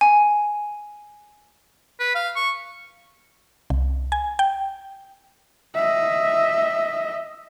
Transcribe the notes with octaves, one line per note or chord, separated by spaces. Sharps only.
G#5
B4
F5
C#6
C2
G#5
G5
D#5 E5